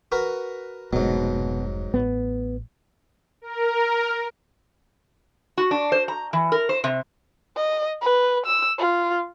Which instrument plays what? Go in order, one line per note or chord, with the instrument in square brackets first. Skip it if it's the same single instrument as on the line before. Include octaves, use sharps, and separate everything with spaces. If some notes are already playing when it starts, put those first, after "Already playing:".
[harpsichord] F#4 A#4 B4
[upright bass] F1 D4 [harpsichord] G#2 F#3 [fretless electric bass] B2
[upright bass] A1 [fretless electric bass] B3
[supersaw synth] A#4
[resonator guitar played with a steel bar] F#4
D4
C5
A#5
E3
A#4
C5
C3
[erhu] D#5
B4
E6
F4